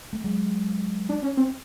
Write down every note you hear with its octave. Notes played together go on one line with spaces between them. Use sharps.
A3
F#3 G#3
D4
C#4
C4